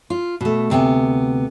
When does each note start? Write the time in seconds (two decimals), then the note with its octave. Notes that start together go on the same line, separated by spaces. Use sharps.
0.10 F4
0.41 B2 A3
0.70 D2 C3 B3 G#5